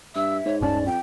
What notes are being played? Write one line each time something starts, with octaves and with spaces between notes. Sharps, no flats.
G2 E5 E6
G#2 C#5
D1 G2 C#4 D5 A5
F2 G5